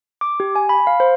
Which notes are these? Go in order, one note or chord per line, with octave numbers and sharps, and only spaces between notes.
D6
G4
G#5
B5
F5
C5